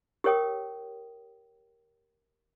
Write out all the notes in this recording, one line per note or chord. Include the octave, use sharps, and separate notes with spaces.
G4 A#4 C#5 G5 D#6